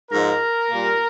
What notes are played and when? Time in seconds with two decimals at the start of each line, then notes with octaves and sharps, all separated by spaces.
0.11 G#2 F3 G#3 A#4
0.70 A#2 G3 A#3